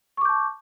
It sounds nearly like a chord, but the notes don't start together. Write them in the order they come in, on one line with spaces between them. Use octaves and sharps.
C#6 D6 G6 A5